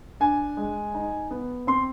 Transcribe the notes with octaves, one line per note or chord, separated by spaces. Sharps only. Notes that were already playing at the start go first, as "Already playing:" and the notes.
D4 G#5
G#3
D#4
B3
C4 C6